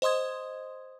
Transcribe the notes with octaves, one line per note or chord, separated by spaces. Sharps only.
C5 D#5 C6 D#6 G#6